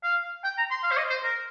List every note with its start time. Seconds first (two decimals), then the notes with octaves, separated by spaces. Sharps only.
0.04 F5
0.44 G5
0.58 A#5
0.71 C6
0.84 F5
0.91 C5
0.97 D#5
1.10 C5
1.23 A#4